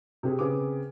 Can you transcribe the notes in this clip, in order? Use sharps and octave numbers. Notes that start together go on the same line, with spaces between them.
C3 C4 G4 G#4
C#3 C4 G#4 B4 D6